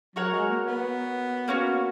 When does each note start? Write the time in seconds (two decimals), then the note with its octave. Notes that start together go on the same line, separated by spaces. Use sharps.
0.15 F#3 F#4 A#4 C#5 F#5
0.32 G#3
0.49 A#3
0.66 B3
1.48 A#3 C#4 F#4